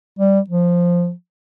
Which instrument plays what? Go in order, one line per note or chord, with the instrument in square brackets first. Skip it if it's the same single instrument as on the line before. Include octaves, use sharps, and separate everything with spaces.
[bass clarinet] G3
F3